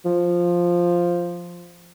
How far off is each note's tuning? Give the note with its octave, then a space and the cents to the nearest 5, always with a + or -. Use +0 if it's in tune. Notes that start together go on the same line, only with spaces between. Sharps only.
F3 +0